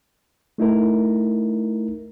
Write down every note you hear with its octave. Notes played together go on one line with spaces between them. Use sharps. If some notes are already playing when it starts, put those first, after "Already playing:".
A3 D#4 E4 A#4